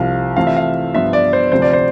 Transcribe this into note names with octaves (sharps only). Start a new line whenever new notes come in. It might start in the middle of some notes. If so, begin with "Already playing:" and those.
Already playing: C2 C3 F3 F5
C3 E3 A3 C4 F4 F5
E5
F5
G2 F3 B3 F4 E5
D5
C5
D2 C3 F3 C4 C5
D5
C5